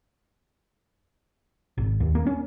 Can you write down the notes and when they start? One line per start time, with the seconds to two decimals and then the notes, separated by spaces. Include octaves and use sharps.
1.78 G#1
2.00 D#2
2.15 A#3
2.26 C#4